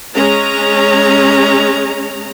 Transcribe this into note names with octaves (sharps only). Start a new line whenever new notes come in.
G#3 C#4 A#5